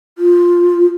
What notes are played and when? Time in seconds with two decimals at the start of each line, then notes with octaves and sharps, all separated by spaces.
0.18 F4